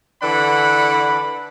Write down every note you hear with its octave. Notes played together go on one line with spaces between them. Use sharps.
D3 E3 D4 A4 F#5 B5